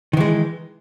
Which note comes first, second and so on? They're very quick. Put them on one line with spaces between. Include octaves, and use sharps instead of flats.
D#3 E3 G#3